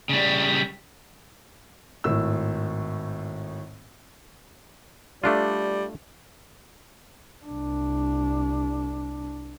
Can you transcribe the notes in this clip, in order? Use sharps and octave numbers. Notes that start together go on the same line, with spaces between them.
C#3 G3
G#1 A2 E6
G3 A3 D4 F4
C2 D4